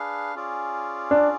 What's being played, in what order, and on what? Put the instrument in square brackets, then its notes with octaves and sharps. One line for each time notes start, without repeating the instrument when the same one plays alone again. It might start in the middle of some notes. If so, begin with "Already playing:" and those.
Already playing: [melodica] D4 G#4 B4 F5
C#4 F4 G#4 D5
[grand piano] D4